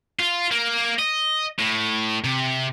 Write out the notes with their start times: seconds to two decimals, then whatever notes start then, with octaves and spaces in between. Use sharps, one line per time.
0.20 F4
0.51 A#3
0.99 D#5
1.59 A2
2.24 C3